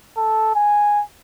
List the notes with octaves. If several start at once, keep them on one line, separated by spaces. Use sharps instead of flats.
A4
G#5